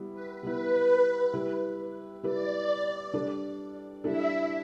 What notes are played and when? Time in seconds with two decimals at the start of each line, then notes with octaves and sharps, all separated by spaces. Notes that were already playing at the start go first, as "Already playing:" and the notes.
Already playing: G3 B3 E4
0.13 B4
0.43 G3 B3 E4 B4
1.33 G3 E4 G4 B4
2.23 G3 E4 G4 B4 D5
3.14 G3 D4 A4
4.04 G3 D4 E4 A4 E5